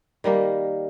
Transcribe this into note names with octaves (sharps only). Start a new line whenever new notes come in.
D#3 G3 A#3